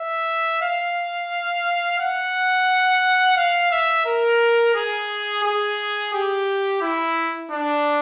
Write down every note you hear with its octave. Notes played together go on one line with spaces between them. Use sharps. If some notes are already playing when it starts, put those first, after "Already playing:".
Already playing: E5
F5
F#5
F5
E5
A#4
G#4
G#4
G4
E4
D4